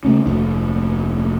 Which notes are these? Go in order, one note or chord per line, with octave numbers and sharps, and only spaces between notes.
C#3 A3 C#4
F1 D2 D4